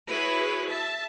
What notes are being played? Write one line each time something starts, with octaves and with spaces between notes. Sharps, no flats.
E4 F#4 G#4 B4 C#5
E5 A5